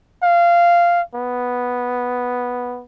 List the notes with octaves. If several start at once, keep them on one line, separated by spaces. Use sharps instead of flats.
F5
B3